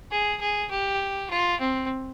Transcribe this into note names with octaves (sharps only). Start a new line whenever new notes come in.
G#4
G#4
G4
F4
C4